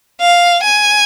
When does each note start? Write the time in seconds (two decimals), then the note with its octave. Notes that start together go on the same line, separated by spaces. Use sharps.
0.21 F5
0.63 G#5